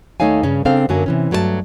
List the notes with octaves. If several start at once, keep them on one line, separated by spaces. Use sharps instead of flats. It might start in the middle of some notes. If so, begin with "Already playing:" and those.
D#2 A3 D#4 C#5 F5 G#5
G2 C#3 C#4
C#3 C4 D4 A4 C5 F5
F#2 D3 F#3 A#3 G#5
C3 E3 C#4
G2 F#3 A3 C5 A5